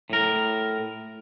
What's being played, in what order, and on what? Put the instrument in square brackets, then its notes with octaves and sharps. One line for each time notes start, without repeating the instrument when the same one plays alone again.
[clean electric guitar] A2 A#4